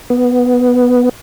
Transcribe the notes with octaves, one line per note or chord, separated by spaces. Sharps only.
B3